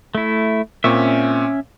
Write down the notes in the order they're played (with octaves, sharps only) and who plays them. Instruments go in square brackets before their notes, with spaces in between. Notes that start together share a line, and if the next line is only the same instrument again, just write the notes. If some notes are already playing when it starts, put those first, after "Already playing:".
[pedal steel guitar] A3 E4
[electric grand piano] A#2 C4 C#6 [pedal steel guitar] C#4 E5